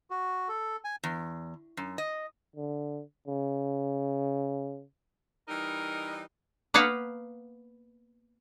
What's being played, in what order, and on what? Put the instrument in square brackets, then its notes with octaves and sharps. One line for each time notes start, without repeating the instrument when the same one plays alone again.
[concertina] F#4
A4
G#5
[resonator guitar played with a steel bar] E2
F#2
D#5
[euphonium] D3
C#3
[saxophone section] E3 G3 D#4 [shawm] A#4
[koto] A#3 B3 B4 F5 F#5